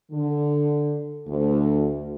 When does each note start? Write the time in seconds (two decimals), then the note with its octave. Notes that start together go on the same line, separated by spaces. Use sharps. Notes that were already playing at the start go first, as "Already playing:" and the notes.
0.12 D3
1.28 D2